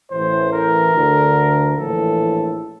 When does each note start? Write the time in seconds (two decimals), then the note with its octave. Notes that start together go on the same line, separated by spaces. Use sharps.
0.11 A1 A2 E3 C5
0.51 A#4
0.93 D2 D3
1.75 A#1 A2 E3 A4